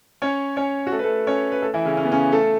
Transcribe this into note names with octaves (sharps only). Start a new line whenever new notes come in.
C#4 C#5
C#4 C#5
F#4
A3 A4
B4
A3 A4
C#4 C#5
B4
A3 A4
E3 E4
C#3 C#4
C#4
B3
C#3 C#4
A3 A4